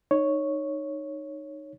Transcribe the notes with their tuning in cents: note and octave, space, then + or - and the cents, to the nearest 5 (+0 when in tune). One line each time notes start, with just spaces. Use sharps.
D#4 -20 C#5 +0